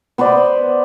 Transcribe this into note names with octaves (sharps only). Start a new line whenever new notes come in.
B3 B4 C5 D5